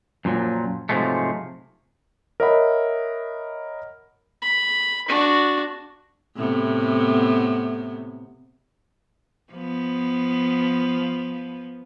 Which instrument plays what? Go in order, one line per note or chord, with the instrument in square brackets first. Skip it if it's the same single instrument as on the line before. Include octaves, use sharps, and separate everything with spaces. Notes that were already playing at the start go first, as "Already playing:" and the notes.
[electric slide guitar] F#2 A#2 F3 F#3
G#2 C3 F3 F#3 G#3 A3
[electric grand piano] A#4 C#5 D#5 E5 F#5 B5
[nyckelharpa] B5
D4 F#4
[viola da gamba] A2 C3 B3
F3 B3